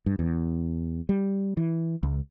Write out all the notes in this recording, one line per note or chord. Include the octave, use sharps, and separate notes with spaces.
G2
E2
G3
E3
C#2